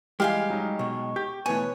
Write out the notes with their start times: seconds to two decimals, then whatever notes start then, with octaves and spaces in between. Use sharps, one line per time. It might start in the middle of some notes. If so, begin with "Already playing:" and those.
0.20 E3 G3 G#3 G4 F5 G#5 F6
0.50 F#3 D#4
0.79 B2 G#3 C#6
1.16 G4 G6
1.46 B2 E3 A3 B4 C#5 G#5